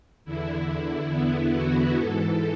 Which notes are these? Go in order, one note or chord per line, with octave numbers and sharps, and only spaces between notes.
E2 D3 E4
B3
F#4
G#2 E3 A4